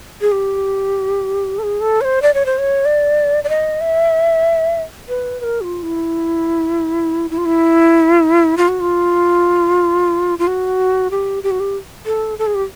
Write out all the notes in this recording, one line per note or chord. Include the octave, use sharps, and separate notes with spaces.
G#4
G4
A4
G#4
A4
C#5
C5
D5
C#5
C5
C#5
D5
D5
D#5
E5
B4
B4
A#4
F#4
F4
E4
E4
F4
E4
F4
F#4
F4
F4
F#4
G4
G4
F#4
G4
A4
A4
G#4
G4